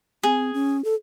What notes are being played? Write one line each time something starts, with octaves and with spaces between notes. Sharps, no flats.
C4 G#4
C#4
A4